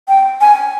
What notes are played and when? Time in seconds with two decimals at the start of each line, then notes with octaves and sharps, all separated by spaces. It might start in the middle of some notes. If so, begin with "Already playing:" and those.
0.08 G5
0.41 G#5